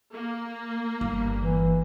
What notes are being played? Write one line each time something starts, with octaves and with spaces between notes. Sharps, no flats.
A#3
G1
E3